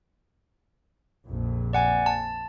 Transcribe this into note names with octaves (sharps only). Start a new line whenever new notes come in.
A#1 F2
D5 F#5 G#5
A5